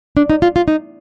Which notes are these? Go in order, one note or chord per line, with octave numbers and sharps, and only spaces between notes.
D4
D#4
F4
F4
D#4